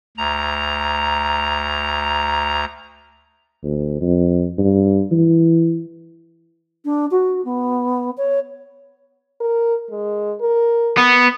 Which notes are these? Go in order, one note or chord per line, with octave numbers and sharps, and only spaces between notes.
D2 A#5
D2
F2
G2
E3
D4
F#4
B3
C#5
A#4
G#3
A#4
B3